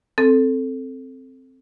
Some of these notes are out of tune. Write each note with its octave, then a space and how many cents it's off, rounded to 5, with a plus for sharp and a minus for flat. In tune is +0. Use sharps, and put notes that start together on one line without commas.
C4 +0 A4 +0